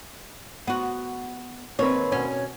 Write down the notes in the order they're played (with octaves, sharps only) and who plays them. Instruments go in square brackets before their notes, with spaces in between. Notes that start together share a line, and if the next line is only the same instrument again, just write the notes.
[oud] B3 F#4
[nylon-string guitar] D#2 C4 B4 [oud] C#5
[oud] B2 C#4